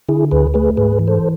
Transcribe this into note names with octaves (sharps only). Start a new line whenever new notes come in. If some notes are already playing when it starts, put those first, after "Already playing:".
D3 E4 G#4
D2 G#4 B4
A3 G#4 B4
G#2 G#4 B4
E3
A4 C5